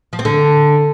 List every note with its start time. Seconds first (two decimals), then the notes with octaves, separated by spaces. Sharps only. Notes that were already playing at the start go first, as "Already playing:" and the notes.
0.13 F3
0.19 C4
0.25 D3